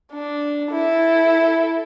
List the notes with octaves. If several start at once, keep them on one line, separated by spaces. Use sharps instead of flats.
D4
E4 A4